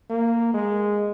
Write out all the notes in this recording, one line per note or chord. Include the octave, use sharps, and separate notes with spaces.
A#3
G#3